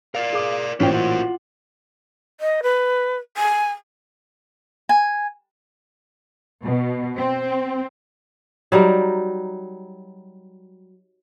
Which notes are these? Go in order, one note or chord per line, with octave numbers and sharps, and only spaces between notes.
A#4 D5 F5
G#4 D6
A1 A#2 C#4 F4 F#4 A#4 C5 G5
F4 F#5
D#5
B4
G#5
G#5
B2
C4
F#3 G3 D#4 A#4